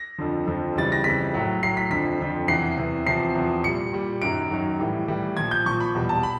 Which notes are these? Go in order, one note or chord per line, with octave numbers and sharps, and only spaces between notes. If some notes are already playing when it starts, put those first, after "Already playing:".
Already playing: A#6
F2 D3 F3
F2 D3 F3
F2 C#3 E3 G3 A6
A#6
F2 C#3 E3 G3 B6
A2 F#3
A2 F#3 C7
B6
F2 D3 F3 B6
F2 D3 F3
E2 C3 E3 C7
E2 C3 E3
E2 C3 F3 C7
E2 C3 F3
A#2 G3 C#7
A#2 G3
F#2 D#3 F#3 D7
F#2 D#3 F#3
A2 E3 G3
A2 E3 G3
A#2 F3 G#6
G6
A#2 F3 C#6
B5
E2 B2 G3
A5
B5